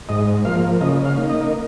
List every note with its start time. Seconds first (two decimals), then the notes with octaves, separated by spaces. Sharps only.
0.09 G#2 D#5
0.45 F3 A#3 F5
0.81 C#3 D#5
1.05 F5
1.17 A#3 D#4
1.30 D#5